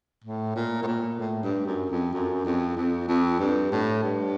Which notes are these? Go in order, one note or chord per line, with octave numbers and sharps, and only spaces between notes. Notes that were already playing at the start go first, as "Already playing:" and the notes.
A2
A#2
A2
A#2
A2
G2
F#2
F2
F#2
F2
F2
F2
G2
A2
G2